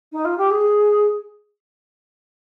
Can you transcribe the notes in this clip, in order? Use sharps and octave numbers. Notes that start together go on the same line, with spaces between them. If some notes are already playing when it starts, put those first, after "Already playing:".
D#4
F4
G4
G#4